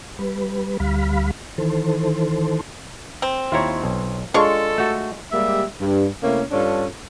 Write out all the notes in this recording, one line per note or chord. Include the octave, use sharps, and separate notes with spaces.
G3 B4
D2 G3 F5 B5
D#3 E3 A4 C5
C4
D#2 E4 F4 C#5 A#5
B1
G#3 D4 F4 A4 C#5 F5 C#6
A3 F#4
G3 G#3 A#3 G4 E5
G2
C3 A3 A#3 C#4 E4
G2 C#4 D4 F4 A4